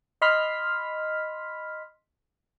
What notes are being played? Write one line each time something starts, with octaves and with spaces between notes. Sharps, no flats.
D#5 B5 C6 F6 B6